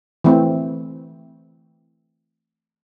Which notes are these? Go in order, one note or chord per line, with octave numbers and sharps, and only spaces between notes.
E3 A3 C4